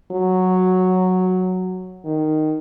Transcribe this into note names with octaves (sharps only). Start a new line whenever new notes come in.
F#3
D#3